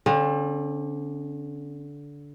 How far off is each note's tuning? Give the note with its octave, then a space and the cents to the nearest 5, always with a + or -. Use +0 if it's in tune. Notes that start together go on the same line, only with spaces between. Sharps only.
D3 -20 C4 +45